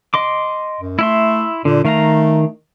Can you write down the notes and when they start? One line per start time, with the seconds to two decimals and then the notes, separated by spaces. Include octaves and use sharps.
0.14 D#5 C6 D6
0.81 F#2
0.99 A3 E4 E5 C6
1.65 A#2 D3
1.85 D#3 A3 F5 A#5